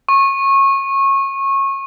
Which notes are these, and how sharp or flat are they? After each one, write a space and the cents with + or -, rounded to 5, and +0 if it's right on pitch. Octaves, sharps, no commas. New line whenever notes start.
C#6 -25